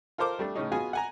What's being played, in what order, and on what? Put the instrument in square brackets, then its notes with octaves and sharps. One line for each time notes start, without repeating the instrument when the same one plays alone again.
[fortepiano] F4 A4 A#4 C5 D6
G3 A3 D4
A2 C#3 C#4 D#4
B3 F4 F#4 G#4 G#5
F#5 G#5 A#5